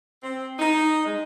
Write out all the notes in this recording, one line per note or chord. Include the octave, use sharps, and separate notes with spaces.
C4
D#4
G#3